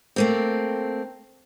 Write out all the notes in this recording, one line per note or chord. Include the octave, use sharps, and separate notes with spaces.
A3 A#3 C4